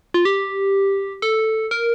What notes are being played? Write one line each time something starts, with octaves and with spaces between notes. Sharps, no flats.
F4
G4
A4
A#4